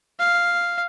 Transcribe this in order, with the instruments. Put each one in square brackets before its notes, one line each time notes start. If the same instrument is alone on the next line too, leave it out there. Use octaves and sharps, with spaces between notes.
[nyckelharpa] F5